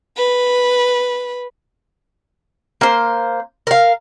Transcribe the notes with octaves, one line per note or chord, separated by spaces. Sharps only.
B4
A#3 C5
A#4 F5